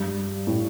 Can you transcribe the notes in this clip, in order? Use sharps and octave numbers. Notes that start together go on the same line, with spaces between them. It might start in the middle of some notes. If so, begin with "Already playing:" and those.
Already playing: G2
A2